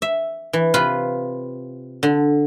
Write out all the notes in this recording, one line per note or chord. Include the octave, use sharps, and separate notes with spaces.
E5
E3
C3 F4 B4 B5
D3